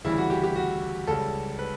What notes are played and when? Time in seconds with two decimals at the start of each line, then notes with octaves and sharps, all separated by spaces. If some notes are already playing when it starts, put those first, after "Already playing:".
0.04 D2 C#3 E3 G3 E4
0.18 F#4
0.30 G4
0.43 G4
0.56 F#4
1.07 C#2 C#3 G3 A4
1.59 B4